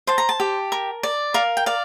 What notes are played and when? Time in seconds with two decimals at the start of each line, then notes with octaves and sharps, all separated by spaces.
0.07 C5 A5
0.18 A#5
0.29 A5
0.40 G4
0.72 A#4
1.03 D5
1.34 A#4 F5
1.57 G5
1.66 D5 F5